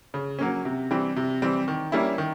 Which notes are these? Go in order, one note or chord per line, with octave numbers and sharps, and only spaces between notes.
C#3
F#3 A#3 C#4
C3
E3 G3 C4
C3
E3 G3 C4
D#3
G3 A#3 C#4 E4
D#3